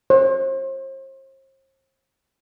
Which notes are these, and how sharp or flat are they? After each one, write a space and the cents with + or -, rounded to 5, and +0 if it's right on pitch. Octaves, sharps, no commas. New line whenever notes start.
C5 +40